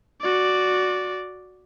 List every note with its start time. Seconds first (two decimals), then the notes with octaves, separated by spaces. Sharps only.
0.21 F#4 D5